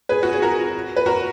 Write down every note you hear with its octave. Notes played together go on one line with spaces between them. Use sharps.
G#4 B4
F#4
G#4
F#4 A#4
B4
F#4 A#4